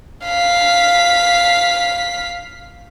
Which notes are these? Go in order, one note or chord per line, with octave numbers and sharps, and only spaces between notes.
F5 B6